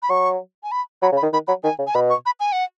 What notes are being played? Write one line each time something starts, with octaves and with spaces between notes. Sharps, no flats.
B5
F#3 C#6
G#5
B5
F#3 B5
C#3
B5
D#3
D#3 B5
F#3 B5
D#3 G#5
C#3
G#5
B2 B5
C#6
B5
G#5
F#5